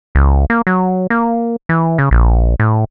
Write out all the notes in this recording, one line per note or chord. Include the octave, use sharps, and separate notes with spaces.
C#2
A#3
F#3
A#3
E3
C#3
A#1
A2